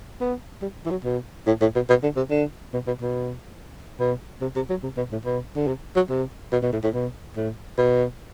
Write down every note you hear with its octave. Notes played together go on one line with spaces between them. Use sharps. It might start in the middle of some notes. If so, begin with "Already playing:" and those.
B3
G3
E3
F#3
B2
A2
A2
B2
B2
D3
C3
D3
B2
B2
B2
B2
C3
C3
F#3
C3
B2
A2
B2
D3
C3
F#3
C3
B2
B2
A2
A2
B2
A2
B2